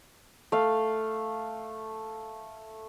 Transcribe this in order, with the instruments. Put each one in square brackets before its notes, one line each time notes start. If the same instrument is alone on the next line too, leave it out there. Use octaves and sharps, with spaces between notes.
[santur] A3 F5